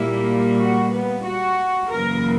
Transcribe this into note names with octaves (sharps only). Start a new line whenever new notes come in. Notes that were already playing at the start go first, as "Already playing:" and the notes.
Already playing: A#2 G3 A#3 E4
F#4
B3
F#4
F#2 C#3 E3 A#3 A#4